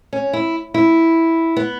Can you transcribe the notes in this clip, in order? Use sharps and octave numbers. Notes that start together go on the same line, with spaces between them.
C#4
E4
E4
B3